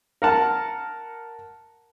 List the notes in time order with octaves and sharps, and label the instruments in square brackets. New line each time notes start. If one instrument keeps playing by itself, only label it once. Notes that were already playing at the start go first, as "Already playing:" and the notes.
[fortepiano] A#4 F#5 A5